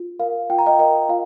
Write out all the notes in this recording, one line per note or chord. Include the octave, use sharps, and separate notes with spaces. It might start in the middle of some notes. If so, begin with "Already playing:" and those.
Already playing: F4
A#4 F5
F4 G5
A#5
D#5 G5
A#4 D#5 G5
F4 F5